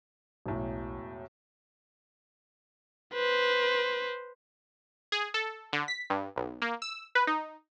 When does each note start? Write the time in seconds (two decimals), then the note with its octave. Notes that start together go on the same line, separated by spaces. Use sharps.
0.46 E1 B1 A2
3.15 B4 C5
5.12 G#4
5.34 A4
5.73 D3
5.88 B6
6.10 G2
6.36 B1
6.62 A#3
6.82 E6
7.15 B4
7.27 D#4